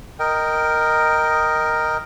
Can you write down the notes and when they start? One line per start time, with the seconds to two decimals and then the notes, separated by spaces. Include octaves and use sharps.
0.19 A#4 D#5 G5